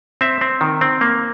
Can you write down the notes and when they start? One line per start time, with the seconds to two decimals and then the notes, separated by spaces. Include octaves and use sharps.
0.21 C4 E5
0.41 C4
0.61 D#3
0.81 C4
1.01 A#3